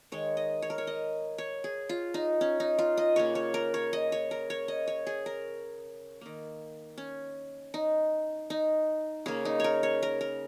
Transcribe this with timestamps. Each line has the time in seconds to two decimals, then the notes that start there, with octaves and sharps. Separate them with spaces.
0.12 D#3 G#3 C#5
0.37 D#5
0.62 C#5
0.70 A#4
0.78 C#5
0.87 D#5
1.38 C#5
1.64 G#4
1.89 F4
2.14 D#4
2.41 C#4
2.60 D#4
2.79 F4
2.98 D#5
3.16 C#3 A#3 C#5
3.35 C#5
3.54 A#4
3.74 C#5
3.93 D#5
4.12 C#5
4.31 A#4
4.50 C#5
4.68 D#5
4.88 C#5
5.07 G#4
5.26 A#4
6.21 D#3 A#3
6.98 C#4
7.74 D#4
8.50 D#4
9.26 C#3 A#3 G#4
9.45 D#4
9.60 A#4 C#5
9.83 C#5
10.03 A#4
10.21 A#4